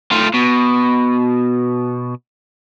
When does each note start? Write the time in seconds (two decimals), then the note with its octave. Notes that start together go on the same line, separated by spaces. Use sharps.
0.12 A3 F4
0.34 B2